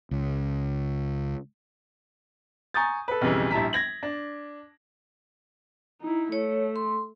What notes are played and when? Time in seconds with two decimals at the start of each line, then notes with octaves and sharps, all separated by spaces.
0.11 C#2
2.74 G#5 A#5 C#6 D#6 G6 A6
3.08 A4 B4
3.21 B1 F2 C#3 E3 G3
3.51 A#1 G3 E4 A5 A#5 B6
3.73 G#6 A#6 F#7
4.03 D4
6.02 D#4 E4
6.32 A3 C#5
6.76 C6